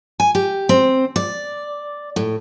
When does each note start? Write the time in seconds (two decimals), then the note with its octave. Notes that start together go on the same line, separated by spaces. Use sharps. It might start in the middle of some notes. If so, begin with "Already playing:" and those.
0.20 G#5
0.35 G4
0.69 C4
1.16 D5
2.16 A2